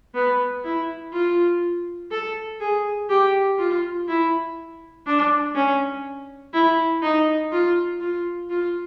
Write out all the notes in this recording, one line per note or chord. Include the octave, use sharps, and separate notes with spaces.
B3
E4
F4
A4
G#4
G4
F4
E4
D4
C#4
E4
D#4
F4
F4
F4